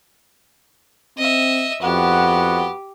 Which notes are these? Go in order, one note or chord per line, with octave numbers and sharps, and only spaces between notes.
C4 D#5 E5
F2 B3 F#4 G4